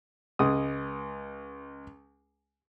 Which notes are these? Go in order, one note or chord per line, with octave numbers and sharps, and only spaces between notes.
C#2 G#3 D#6